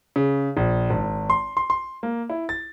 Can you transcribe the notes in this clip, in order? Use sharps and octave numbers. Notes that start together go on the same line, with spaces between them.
C#3
A#1
G#1
C6
C6
C6
A#3
E4
A6